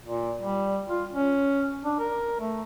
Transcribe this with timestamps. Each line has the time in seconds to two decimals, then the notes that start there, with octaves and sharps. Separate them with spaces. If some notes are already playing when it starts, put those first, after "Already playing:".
0.03 A#2
0.42 G3
0.88 F4
1.13 C#4
1.85 D4
1.99 A#4
2.40 A3